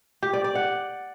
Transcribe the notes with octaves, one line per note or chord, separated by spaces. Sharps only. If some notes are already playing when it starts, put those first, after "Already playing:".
G4
D5
D5
F#5